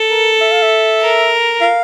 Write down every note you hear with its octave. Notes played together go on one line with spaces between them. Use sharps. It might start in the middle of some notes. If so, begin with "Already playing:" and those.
Already playing: A4
A#4
E5
F5
E5
A#4
F5